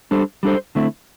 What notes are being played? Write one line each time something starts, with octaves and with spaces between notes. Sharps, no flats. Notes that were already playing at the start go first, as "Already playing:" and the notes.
G3 D4 A4 C5
G3 D4 A4 C5
D3 A3 C4 E4